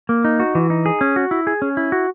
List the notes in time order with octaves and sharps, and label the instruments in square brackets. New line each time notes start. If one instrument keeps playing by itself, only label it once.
[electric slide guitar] A#3
D#4
F#4
E3
D#4
G#4
C#4
F#4
E4
G#4
C#4
E4
F#4